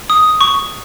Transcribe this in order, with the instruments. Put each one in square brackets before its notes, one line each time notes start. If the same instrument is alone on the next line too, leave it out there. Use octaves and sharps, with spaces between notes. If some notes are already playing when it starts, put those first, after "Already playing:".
[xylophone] D#6
C#6